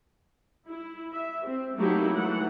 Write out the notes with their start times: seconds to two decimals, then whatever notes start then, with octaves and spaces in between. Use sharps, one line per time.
0.68 E4
1.13 E5
1.46 C4
1.78 F#3 A3 A#3 D#4 E4 G4
2.16 E3 F#3 A3 F#5